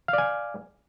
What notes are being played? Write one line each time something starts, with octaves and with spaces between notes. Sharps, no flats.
D5 F5 G#5